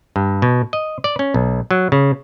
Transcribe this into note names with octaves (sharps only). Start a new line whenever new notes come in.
G2
B2
D#5
D5
C#4
B1
F#3
C#3